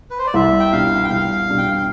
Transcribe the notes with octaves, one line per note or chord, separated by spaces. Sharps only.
B4
C5
D5
C2 E5
G5
B2 G3 D4 F4 F5
G5
C2 F5
B2 G3 D4 F4
G5
F5